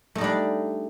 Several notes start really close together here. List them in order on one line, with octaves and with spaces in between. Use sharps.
A3 D#4 G3 D4